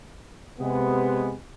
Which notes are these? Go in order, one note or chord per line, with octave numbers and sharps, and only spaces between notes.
C3 G#3 B3